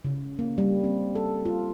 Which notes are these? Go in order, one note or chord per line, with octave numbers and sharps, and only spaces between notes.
C#3
A#3
G3
C4
A4
F4